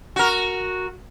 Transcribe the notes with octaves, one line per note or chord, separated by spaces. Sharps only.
F#4 A#4